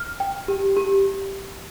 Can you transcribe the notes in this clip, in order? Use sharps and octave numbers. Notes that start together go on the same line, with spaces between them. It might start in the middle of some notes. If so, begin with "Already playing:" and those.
Already playing: F6
G5
G4
G4